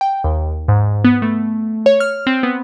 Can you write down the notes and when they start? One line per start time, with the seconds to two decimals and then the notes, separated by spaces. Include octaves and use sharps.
0.01 G5
0.24 D#2
0.68 G#2
1.04 B3
1.22 A3
1.86 C#5
2.00 F6
2.27 C4
2.43 B3